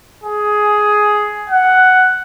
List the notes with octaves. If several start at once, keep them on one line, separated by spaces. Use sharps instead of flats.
G#4
F#5